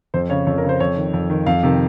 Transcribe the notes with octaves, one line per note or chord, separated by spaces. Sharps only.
F2 C5
C#3 C#5
F2 C#5
A#4
C#3
C5
F2 C#5
D#3
F2
D#3
F2 F5
C3 D#3